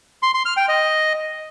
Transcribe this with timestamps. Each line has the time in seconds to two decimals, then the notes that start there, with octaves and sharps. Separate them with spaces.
0.23 C6
0.34 C6
0.46 F6
0.57 G5
0.68 D#5